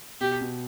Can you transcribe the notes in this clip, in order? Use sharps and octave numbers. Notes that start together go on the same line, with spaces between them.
B2 G4
B2